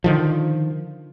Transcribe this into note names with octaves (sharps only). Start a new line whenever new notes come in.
D3 D#3 F3